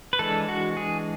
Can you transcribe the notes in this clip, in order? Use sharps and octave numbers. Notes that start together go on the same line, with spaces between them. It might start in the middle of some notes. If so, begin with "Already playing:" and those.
B4
E3 G#3 D4 A4
F#4
G#4